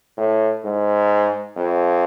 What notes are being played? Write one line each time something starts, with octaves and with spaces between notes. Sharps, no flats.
A2
G#2
F2